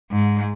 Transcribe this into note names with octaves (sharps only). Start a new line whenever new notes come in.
G#2